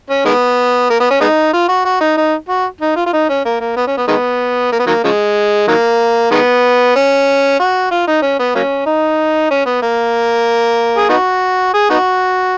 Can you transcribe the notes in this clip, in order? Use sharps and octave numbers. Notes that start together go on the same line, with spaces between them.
C#4
D#3 G#3 B3
A#3
B3
C#4
G#3 B3 D#4
F4
F#4
F#4
D#4
D#4
F#4
D#4
F4
F4
D#4
C#4
A#3
A#3
B3
C#4
B3
D#3 G#3 B3
A#3
B3
D#3 F#3 A#3
C#3 F3 G#3
D#3 F#3 A#3
D#3 G#3 B3
C#4
F#4
F4
D#4
C#4
B3
F#3 A#3 C#4
D#4
C#4
B3
A#3
G#4
B3 D#4 F#4
G#4
B3 D#4 F#4